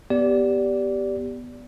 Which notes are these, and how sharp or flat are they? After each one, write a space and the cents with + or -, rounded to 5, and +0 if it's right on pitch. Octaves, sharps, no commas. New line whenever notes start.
B3 +0 G4 +0 D5 -15